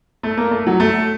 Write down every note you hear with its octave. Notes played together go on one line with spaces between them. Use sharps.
A3
A#3
A3
F#3
A3